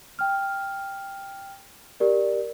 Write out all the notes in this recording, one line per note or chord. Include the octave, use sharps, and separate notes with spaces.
G5 F6
G4 A#4 D5